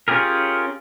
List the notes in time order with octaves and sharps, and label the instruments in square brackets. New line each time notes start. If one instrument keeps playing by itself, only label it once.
[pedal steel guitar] C#4 F4 G4 G#4 A#4